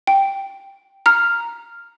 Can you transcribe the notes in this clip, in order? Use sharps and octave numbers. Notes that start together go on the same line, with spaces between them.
G5
A#5 F6